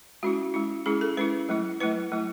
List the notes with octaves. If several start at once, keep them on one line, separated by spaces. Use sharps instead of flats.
G#3 C#4 E4 F#4
G#3 C#4 E4
G#3 C#4 E4 G#4
A4
G#3 C#4 E4 B4
F#3 A3 E4
F#3 A3 E4 B4
F#3 A3 E4